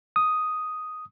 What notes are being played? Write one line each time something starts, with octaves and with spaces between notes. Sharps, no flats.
D#6